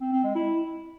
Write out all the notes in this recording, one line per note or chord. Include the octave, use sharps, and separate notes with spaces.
C4
C4
G#3
E4